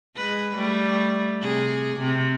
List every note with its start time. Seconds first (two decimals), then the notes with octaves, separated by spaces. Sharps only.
0.17 G#3 B4
0.55 G3 A3
1.41 C3 G#4
1.98 C3